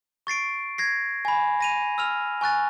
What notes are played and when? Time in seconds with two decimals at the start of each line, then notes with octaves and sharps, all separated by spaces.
0.27 C#6 A6 C7 D7
0.78 G#6 A#6 C7
1.25 G#5 B5
1.60 A#6 D#7 F7
1.98 E6 F6 F7
2.41 G#5 C#6 F#6 A6